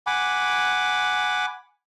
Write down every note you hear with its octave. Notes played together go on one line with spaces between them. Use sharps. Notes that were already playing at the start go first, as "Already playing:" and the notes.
F#5 G#5 B5 D6